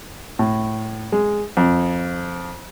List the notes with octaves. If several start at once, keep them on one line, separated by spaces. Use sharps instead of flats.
A2
G#3
F2